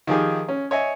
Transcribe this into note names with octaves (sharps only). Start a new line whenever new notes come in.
D#3 F3 G4 G#4
C#4
C#5 D#5 E5 G#5